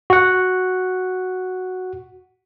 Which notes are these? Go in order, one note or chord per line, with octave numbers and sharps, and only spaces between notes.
F#4 F#5